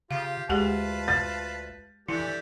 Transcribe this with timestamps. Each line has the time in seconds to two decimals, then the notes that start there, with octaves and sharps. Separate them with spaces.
0.11 C#3 F4 G4 F5
0.49 D2 G#3 F4 G4 G#4 B4 A5
1.08 A6
2.08 E3 A3 D4 E4 G4